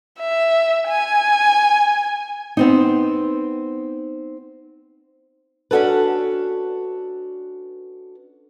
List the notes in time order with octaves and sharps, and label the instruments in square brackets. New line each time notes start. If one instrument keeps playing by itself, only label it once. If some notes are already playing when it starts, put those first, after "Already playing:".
[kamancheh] E5
G#5
[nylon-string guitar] B3 C4 D#4
[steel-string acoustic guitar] C#4 D4 F#4 A4 B4